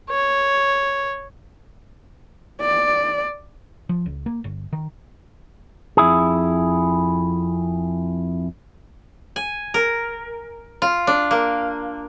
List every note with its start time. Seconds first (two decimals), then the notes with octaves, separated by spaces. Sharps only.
0.10 C#5
2.61 D5
3.89 F3
4.06 C#2
4.26 A#3
4.44 G1
4.73 D#3
5.97 F2 E4 G#4
9.36 G#5
9.74 A#4
10.82 F4
11.07 D4
11.31 A#3